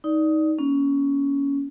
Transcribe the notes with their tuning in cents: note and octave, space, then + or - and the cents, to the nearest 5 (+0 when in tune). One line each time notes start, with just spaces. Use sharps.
D#4 +15 D5 +0
A#3 +40 C#4 +15